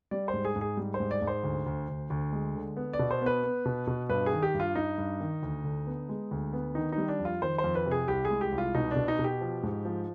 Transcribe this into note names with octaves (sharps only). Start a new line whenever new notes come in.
G3 D5
C5
G#2
G#4
G#2
G#4
G3
C5
G#2
D5
G#2
C5
D2
D2
D2
D2
G#3
D3
B3
D5
B2
C5
B3 B4
B3
B2
B2
G2 B4
G#4
D#3
G4
G2
F4
G2 D#4
G2
D#3
D2
D3
B3
G#3
D2
B3
D#3 D#4
D#4
G3
D4
F2
F4
D#3 C5
C5
F2
B4
C3
G#4
C2 G4
G#4
G#3
G4
C2
F4
B2 D#4
B2 D4
D#4
B2
G4
F3
G#2
F3